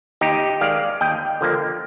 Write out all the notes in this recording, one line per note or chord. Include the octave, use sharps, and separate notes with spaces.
D#2 D#4 G4
D#3 G#3 D5 F5
D#2 D#5 G5
D3 F3 A#3